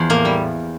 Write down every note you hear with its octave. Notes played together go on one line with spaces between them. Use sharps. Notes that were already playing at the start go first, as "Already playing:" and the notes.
Already playing: E2 F3
A2 A#3
G3